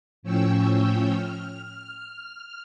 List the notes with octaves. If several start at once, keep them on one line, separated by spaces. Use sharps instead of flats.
A2 F3 C#4 C#5 G5 E6
F6